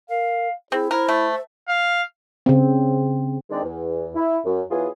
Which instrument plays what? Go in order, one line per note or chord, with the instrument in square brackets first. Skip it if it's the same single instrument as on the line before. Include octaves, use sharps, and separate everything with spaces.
[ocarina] A#4 [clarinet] F5
[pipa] C4 [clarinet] E4 [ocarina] G#4
[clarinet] E4 [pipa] A#4 [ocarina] C5
[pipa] A3
[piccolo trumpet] F5
[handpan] C#3 C4
[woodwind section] D#3 G#3 C4 D4
E2
E4
F#2
E3 F#3 B3 F4 G#4